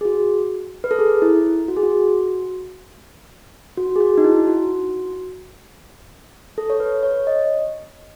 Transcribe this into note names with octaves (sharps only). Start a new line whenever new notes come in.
G#4
F#4
B4
A4
G#4
E4
F#4
G#4
F#4
F#4
G#4
F#4
D#4
E4
F#4
A4
C#5
B4
C#5
D#5